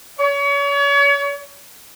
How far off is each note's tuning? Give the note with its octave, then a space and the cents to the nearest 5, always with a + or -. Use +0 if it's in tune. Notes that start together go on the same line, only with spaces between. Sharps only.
C#5 +35